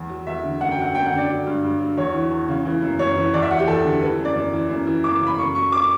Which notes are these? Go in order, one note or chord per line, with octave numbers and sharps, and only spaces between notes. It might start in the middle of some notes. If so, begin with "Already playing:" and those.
Already playing: E2
F#3
E2 E5
D3
F#2 F#5
G5
F#3 F#5
F#2 G5
F#5
D3
D5
F#3
G2
G2
F#3
E2 C#5
E3
E2
C#3
E3
F#2
F#2 C#5
E3
E2 D5
E5
F#3 F#5
G4
E2 A4
D3
E3 B4
F#2
D5
F#2
E3
F#2
E3
F#2 D6
C#3
B5
F#2 C#6
F#3 C#6
D6